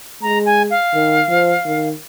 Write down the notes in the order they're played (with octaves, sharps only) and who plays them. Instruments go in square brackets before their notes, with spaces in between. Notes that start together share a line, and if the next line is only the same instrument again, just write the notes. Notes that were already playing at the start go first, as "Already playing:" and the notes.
[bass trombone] G#3 [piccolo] A#5
[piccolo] G#5
F5
[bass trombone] D#3
F3
D#3